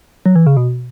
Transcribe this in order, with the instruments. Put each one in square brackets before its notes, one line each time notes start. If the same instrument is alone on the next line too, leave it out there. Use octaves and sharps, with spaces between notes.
[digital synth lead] F#3
E3
C#3
B2